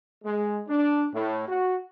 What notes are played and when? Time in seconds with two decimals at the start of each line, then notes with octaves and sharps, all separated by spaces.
0.24 G#3
0.68 D4
1.13 A2
1.48 F#4